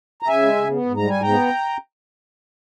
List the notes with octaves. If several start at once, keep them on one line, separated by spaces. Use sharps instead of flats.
A#5
C#3 E5 G#5
G#3
C#3
B3
G#2
G3 A#5
G#2 G#5
G5 A#5
B3